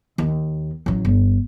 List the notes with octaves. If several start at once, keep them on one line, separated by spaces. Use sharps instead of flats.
D#2
A1 F#3
G1